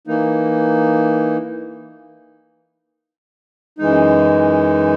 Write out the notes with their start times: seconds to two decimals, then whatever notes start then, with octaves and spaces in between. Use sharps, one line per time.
0.07 E3 A#3 D#4
3.79 F#2 E3 G#3 D#4